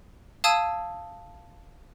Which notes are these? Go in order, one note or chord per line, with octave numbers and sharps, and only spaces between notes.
F5 A5 D#6 E6 G#6 D#7